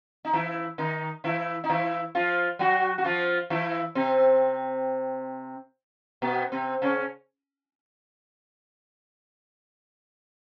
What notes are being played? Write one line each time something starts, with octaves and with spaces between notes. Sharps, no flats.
D#4
E3 E4
D#3 D#4
E3 E4
D#4
E3 E4
F3 F4
F#3 F#4
F#4
F3 F4
E3 E4
C3 C4
B2 B3
C3 C4
C#3 C#4